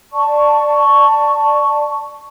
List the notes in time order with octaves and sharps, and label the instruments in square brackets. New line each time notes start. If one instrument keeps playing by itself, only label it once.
[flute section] D5 A5 C#6